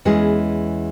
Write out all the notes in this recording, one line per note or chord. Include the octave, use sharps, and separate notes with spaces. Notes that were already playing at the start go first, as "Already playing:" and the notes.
E2 E3 G#3 C#4 G#4